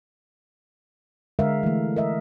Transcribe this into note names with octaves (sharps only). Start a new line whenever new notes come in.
D3 G#3 A#4 E5 F5
E3 A3
A#4 D#5 E5